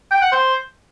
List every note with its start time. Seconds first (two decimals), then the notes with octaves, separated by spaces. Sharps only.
0.11 G5
0.22 F#5
0.32 C5